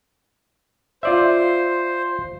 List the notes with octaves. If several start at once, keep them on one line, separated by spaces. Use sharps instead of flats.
F4 C5 D5 E5